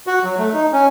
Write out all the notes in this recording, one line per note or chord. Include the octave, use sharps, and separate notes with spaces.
F#4
F#3
A3
D#4
C#4